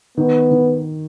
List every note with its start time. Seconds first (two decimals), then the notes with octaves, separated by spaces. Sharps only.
0.17 D#3 B3
0.51 D#3